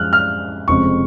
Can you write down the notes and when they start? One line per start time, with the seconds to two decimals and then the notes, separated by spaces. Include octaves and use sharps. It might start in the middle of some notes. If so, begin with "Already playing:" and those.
Already playing: F#2 F3 G#3 F6 F#6
0.13 F6
0.68 F1 F2 C#3 G#3 C#6